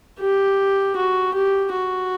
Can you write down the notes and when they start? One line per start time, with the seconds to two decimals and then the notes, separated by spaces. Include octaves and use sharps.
0.20 G4
0.97 F#4
1.34 G4
1.73 F#4